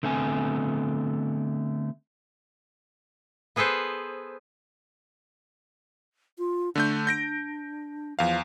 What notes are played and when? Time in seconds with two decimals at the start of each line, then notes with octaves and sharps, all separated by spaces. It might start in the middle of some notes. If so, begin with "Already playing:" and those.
0.03 D3 A3 B3 C4 G#5
3.56 B3 G#4 A4 B4 C5
6.38 F4
6.75 D3 A3 D4 G6
7.07 G6 A#6 D7
8.19 E2 F3 F5